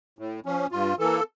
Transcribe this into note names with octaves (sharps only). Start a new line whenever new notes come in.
A2
F3 C#4
G2 F4
E3 A#3 A4